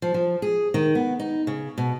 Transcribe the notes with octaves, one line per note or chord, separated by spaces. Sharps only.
F3
F3
G#4
D#3
B3
D#4
C#3
B2